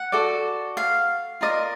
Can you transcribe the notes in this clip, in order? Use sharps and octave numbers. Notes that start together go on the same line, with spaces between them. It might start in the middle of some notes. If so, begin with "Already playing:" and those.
Already playing: F#5
F#4 A4 D5
F5
F4 A#4 D5 D#5